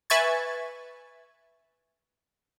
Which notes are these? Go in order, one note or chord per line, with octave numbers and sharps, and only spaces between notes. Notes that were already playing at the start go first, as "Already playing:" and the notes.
B4 E5 G#5 C#6 G#6 A6